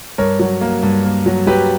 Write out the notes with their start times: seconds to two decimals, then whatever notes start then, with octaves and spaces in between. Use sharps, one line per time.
0.18 G2 A#4 C#5
0.39 F#3
0.61 A#3
0.83 G2
1.05 A#3
1.26 F#3
1.47 F#3 G4 B4